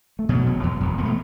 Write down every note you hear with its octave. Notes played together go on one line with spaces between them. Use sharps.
A3
B2 F#3
E1
E2
E1
E1 B3
A3